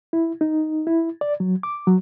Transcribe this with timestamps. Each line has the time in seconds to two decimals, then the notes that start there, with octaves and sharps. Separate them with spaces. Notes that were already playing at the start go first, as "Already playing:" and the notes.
0.13 E4
0.41 D#4
0.87 E4
1.21 D5
1.40 F#3
1.63 D6
1.87 F#3